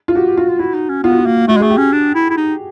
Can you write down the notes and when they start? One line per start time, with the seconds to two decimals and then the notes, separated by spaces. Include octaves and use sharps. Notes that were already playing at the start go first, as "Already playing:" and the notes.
0.08 F4
0.15 F#4 G4
0.26 G4
0.37 F4 F#4
0.49 F4
0.59 E4 F#4
0.74 D#4
0.89 C#4
1.03 B3 F4
1.11 F#4
1.18 F4
1.26 A#3
1.48 A3 F#4
1.57 G#3
1.60 A3 G#4
1.70 G4
1.78 C#4
1.92 D4
2.15 E4
2.30 E4
2.37 D#4